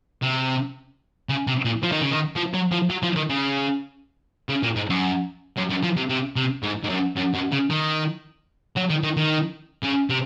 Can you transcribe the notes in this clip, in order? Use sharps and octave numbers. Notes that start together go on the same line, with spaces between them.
C3
C#3
C3
A#2
F3
D#3
C#3
D#3
F3
F#3
F3
F#3
F3
D#3
C#3
C#3
A#2
G#2
F#2
F#2
F#2
F3
C3
C3
C3
G#2
G#2
F#2
F#2
F#2
C#3
D#3
F#3
D#3
D#3
D#3
C#3
C3